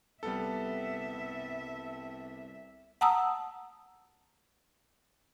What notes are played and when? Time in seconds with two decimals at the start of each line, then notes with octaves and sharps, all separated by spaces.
0.23 C2 G3 B3 A4 E5
3.01 F#5 A5 A#5 D#6 E6